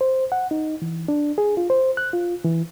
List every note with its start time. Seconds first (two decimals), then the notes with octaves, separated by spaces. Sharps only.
0.01 C5
0.32 F#5
0.51 D#4
0.82 E3
1.08 D4
1.38 G#4
1.57 F4
1.70 C5
1.97 F#6
2.13 F4
2.44 E3